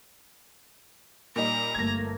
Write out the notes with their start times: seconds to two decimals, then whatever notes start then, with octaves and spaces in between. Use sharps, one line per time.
1.36 A#2 G3 D#4 A#5
1.74 G1 A3 A#3 G#6 A#6